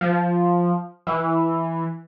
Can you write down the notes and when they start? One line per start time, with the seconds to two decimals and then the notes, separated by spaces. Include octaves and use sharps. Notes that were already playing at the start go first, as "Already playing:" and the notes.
0.01 F3
1.07 E3